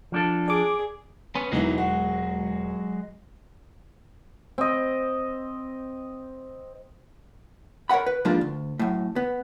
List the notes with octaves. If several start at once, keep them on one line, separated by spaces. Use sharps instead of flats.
F3 D4 A4
G#4 D5 D6
B3 C#4 C6
E1 B2 E3 F#3 G#3 D#4
F#4
C4 D#5
A#4 C#5 E5 F#5 B5
B4
G#2 F3 G3 A#3 D4 F4
D2
F#2 A2
B3